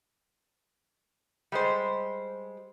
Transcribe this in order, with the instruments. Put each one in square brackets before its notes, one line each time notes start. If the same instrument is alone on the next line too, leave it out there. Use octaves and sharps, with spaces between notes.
[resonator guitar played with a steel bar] G3 G#3 C5